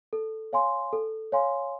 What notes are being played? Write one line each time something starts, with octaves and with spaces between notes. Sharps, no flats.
A4
C#5 F5 G#5 C6
A4
C#5 F5 G#5 C6